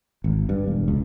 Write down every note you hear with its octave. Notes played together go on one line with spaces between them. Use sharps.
G#1
G2
E1
C#2